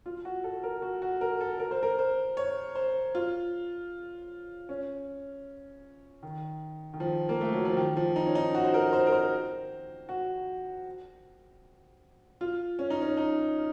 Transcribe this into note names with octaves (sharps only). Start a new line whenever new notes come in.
F4
F#4
A4
A#4
F#4
F#4
A#4
A4
A#4
C5
A#4
C5
C#5
C5
F4
C#4
D#3
D#3
F3
A#3
A3
F#3
F3
D#3
F3
D#4
C#4
D#4
F#4
C5
A#4
C5
A#4
C5
F#4
F4
C#4
D#4
C#4
D#4